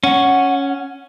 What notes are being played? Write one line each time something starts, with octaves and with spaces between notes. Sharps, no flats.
C#4 F#5